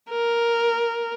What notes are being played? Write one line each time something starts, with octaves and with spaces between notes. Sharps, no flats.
A#4